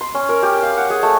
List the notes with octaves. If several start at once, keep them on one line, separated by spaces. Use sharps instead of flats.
C6
C#4
A#4
G4
F5
F#5
G#4
A3